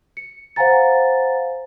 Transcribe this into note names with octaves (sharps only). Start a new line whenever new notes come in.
C#7
C5 F5 F#5 G#5 A#5 A6